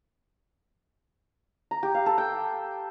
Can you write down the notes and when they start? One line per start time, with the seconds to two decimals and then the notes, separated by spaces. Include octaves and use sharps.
1.71 A#5
1.83 G4
1.94 F5
2.06 A4
2.18 G5